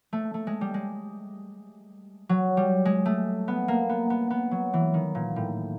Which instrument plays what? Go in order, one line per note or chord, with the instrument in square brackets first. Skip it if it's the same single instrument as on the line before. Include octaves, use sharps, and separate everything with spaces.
[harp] A3
A3
G#3
G3
G#3
F#3
G3
G#3
A3
B3
A#3
B3
B3
B3
F#3
E3
D#3
A#2
A2